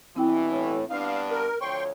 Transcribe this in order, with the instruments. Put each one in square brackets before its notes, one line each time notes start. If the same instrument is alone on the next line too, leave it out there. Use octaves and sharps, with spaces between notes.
[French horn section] G2 B2 E3 [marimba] C4 E4 G5
[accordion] A2
[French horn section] G2 B3 D4 [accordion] F5
[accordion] A#4
[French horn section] D2 F3 C#5 [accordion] G5 C6 C#6